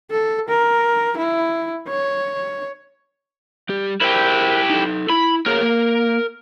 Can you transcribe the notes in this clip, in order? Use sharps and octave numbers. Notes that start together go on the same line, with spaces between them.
A4
A#4
E4
C#5
G3 G4
E4 G4 A#4 C5
D#4 A4
E4 B5
A#3 G#4 A#4 C#5
A#3